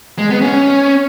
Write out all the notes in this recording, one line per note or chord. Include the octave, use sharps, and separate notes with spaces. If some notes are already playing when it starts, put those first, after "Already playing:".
G#3
B3
C#4